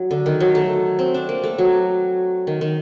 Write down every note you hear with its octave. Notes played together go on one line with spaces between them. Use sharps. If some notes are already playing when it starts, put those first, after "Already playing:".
Already playing: F#3
D3
D#3
F#3
A3
C4
D4
A#3
A3
F#3
D#3
D#3